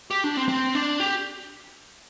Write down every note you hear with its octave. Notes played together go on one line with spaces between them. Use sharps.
G4
D4
C4
C4
D4
G4